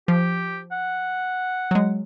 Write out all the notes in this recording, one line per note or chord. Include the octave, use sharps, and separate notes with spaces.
F3 G4
F#5
F#3 G#3